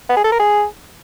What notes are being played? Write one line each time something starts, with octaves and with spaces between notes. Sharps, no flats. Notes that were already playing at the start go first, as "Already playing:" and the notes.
B3
G#4
A4
A#4
G#4